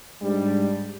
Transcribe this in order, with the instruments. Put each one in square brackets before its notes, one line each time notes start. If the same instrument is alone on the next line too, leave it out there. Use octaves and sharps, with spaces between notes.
[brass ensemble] G#2 G3 D4